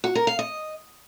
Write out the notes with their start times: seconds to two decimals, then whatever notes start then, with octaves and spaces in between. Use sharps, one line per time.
0.04 F#4
0.15 A#4
0.27 F5
0.39 D#5